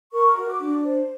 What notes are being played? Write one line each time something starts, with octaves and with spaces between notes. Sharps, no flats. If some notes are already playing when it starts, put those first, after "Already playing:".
A#4 C#6
F#4
D6
D4
C5